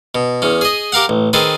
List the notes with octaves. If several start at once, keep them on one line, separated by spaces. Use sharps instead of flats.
B2
E2 C#4
G#4 D#5
G4 A#4 F5 F#5
A1
D#3 C4 G#4 A4 B4